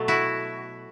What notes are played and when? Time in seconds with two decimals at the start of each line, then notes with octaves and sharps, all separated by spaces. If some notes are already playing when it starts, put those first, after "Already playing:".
Already playing: B2 F#3 A3
0.08 E4 F#4